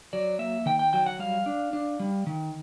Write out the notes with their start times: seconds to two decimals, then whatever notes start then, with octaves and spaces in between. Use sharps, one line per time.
0.13 F#3 D5
0.39 A#3 E5
0.66 D#3 G5
0.79 G5
0.93 F#3 G5
1.06 F#5
1.19 G3 F5
1.46 D4
1.73 D4
2.00 G3
2.27 D#3